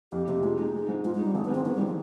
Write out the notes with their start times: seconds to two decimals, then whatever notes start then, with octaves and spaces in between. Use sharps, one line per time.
0.12 F2 G4
0.28 C3 G4
0.43 G#3 F4
0.58 G#3 D#4
0.73 G#3
0.88 G#2
1.05 G#2 F4
1.15 G#3
1.20 G3 D#4
1.34 G#1 G#3
1.45 B3
1.50 G#2 C4
1.65 D#3 B3
1.75 G3
1.81 D#3
1.86 F3